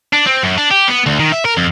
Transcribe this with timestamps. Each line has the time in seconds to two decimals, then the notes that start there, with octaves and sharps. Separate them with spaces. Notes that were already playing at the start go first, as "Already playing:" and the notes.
0.13 D4
0.26 C4
0.43 F#2
0.58 D4
0.71 G4
0.88 B3
1.06 D2
1.20 D#3
1.32 E5
1.45 A#4
1.57 F2